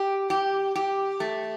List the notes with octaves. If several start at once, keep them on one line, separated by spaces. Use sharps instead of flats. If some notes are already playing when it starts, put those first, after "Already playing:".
Already playing: G4
G4
G4
A3